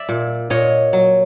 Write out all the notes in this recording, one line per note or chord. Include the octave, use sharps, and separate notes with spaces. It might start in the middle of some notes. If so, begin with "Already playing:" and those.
Already playing: D5 E5
A#2
A#2 C#5 D#5
F#3